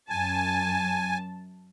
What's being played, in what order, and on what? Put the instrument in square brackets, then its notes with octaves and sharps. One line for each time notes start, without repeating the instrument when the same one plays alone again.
[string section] F#2 A5 [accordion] G#5